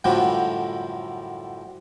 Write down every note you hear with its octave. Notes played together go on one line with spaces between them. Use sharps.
F#2 A2 D3 F3 G3